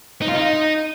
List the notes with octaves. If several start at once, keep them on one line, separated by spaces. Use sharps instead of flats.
D#4
F4
D#4